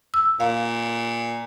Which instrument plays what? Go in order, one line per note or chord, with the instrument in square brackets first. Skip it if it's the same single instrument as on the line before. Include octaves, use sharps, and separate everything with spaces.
[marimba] E6
[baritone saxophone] A#2 [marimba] F5